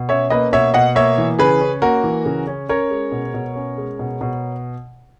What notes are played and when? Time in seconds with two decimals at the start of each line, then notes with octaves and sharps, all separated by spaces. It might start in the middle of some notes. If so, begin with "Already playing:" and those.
Already playing: B2
0.09 C#4 C#5 E5
0.30 A#3 B4 D#5
0.53 B2 C#5 E5
0.74 B2 D#5 F#5
0.95 A#3 C#5 E5
1.18 E3
1.39 C#3 G#4 B4
1.61 C#4
1.82 A#3 F#4 A#4
2.03 E3
2.26 C#3
2.47 C#4
2.69 C#4 A#4 C#5
2.90 G#3
3.12 B2
3.34 B2
3.55 C#4
3.77 G#3
3.99 B2
4.21 B2